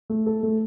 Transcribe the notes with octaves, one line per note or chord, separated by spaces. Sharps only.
A3
A4
A3